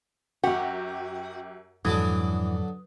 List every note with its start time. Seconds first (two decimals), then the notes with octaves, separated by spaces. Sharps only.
0.44 F#2 F#4 G4
1.85 F2 G#2 D3 E3 F#3 D4 D#6